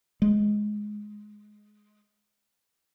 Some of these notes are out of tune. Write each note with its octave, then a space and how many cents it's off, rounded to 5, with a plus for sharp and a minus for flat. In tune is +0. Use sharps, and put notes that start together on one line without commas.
G#3 +10